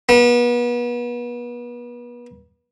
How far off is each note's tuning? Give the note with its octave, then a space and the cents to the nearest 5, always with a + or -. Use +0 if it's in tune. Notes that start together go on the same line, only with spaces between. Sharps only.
B3 -35